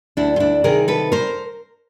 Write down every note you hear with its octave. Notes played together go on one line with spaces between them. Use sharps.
D2 D4 E4
F4
D4 E4
C3 D#3 G#4 A#4
A4 B4
A#4 C5